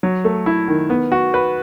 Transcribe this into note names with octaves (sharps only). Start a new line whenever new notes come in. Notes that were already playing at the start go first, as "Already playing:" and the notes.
F#3
A3
E4
D#3
B3
F#4
B4